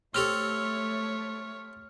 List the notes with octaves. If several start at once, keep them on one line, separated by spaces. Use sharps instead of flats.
A3 C4 G4 A4 C#5 F6 F7